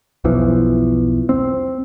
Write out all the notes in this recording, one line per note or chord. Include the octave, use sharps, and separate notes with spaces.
B1 E2 E3 F3
C4